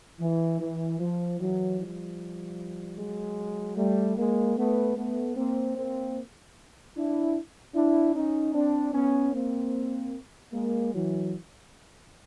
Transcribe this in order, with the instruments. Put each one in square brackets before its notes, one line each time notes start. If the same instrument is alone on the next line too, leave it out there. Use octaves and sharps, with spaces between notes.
[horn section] E3
E3
F3
E3 F#3
F3 G3
F#3 G#3
G3 A3
G#3 A#3
A3 B3
A3 B3
A#3 C4
A#3 C4
D4 E4
D4 E4
C#4 D#4
C4 D4
B3 C#4
A#3 C4
G#3 A#3
E3 F#3